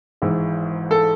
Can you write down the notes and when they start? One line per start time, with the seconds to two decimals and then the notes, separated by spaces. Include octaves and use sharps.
0.22 G#1 G#2 E3
0.91 A4